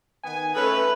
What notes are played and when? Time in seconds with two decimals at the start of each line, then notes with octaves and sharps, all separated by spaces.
0.23 D#3 B3 G#5
0.55 A3 C#4 B4